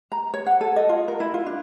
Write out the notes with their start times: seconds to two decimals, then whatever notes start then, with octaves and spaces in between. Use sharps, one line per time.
0.12 A#5
0.34 C#5
0.46 F#5
0.61 A4
0.76 D#5
0.89 F4
1.08 A#4
1.20 E4
1.34 F4
1.46 D4